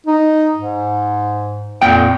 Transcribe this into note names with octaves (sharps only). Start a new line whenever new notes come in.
D#4
G#2
F2 A#2 F#5 G5